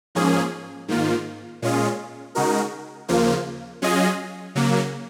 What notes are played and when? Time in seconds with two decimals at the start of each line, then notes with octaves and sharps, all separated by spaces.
0.15 G#2 F3 A#3 C#4 G#4
0.88 G#2 D#3 A#3 F4
1.62 A#2 G#3 C#4 F4 G#4
2.35 C#3 G#3 D#4 F#4 A#4
3.08 D#2 C#3 F3 A#3 F4
3.82 F#3 C#4 F4 G#4 D#5
4.55 C#3 F#3 A#3